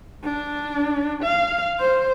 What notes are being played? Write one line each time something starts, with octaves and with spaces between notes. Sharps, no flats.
D4
F5
C5